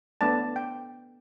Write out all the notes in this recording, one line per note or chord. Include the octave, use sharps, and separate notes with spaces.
A3 B3 D4 D5 A5
G5